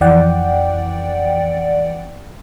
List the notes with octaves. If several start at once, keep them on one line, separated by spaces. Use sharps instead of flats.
F2 E3 D5 F#5 G5